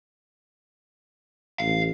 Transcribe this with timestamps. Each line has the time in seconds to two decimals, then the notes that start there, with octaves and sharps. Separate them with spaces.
1.60 A1 F5